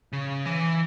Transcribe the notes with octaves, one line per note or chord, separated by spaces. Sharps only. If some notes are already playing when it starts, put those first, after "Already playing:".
C#3
E3